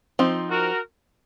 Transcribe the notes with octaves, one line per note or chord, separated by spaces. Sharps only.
F3 C4 D#4
F#4 A#4